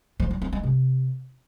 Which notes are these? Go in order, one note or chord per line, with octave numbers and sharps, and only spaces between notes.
F3
F#3
C4
G#3
C3